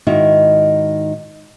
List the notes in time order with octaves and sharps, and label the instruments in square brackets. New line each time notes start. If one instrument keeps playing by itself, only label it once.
[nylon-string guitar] G#2 D#3 D#4 E4 F#4